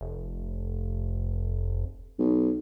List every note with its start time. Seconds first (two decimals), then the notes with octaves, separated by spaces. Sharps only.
0.01 F1
2.19 B1